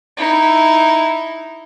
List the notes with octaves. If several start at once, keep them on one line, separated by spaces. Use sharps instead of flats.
D#4 E4